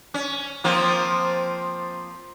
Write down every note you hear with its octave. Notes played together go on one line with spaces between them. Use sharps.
C#4
F3 A#3 C4